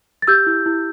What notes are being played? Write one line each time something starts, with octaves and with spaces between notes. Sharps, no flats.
A6
G4 E6 G6
E4
E4